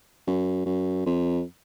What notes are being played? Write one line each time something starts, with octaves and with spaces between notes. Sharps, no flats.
F#2
F#2
F2